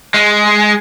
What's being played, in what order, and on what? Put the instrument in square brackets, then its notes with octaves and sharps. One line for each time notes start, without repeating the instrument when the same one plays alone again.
[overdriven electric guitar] G#3